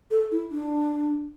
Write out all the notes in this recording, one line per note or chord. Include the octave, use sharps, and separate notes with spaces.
A4
E4
D4